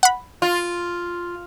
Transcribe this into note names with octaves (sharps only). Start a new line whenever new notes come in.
F#5 B5
F4